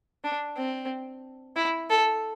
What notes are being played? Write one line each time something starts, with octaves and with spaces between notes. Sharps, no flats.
D4
C4
E4
A4